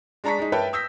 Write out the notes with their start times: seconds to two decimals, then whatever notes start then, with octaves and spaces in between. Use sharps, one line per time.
0.24 G#3 D4 A5 A#5 C#6 B6
0.39 G#3 D#4
0.52 A#4 B4 C#5 E5 G5 A5
0.73 D#6 E6 G6 A#6 B6